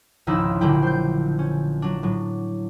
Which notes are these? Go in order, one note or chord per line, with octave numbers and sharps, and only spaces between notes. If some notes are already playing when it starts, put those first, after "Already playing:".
G#1 C#2 F3 D#4 E4 E6
A#1 A#2 D3 F#3 E4 G5
C5 G6
C#4
F#3 D4
A2 F#3